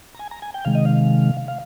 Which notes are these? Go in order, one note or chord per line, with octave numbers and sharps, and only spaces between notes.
A#5
G#5
A#5
G#5
G5
C3 D#3 G#3 F5
D#5
F5
F5